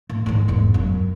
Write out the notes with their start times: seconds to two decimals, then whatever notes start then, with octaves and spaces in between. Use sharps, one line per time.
0.10 A2
0.26 G#2 D#3
0.48 E1 G#2
0.74 F#2